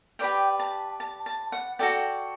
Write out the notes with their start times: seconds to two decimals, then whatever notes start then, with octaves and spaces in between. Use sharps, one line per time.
0.19 G4 B4 D5 G5
0.59 A5
1.00 A5
1.26 A5
1.52 F#5
1.79 F#4 A4 D5 G5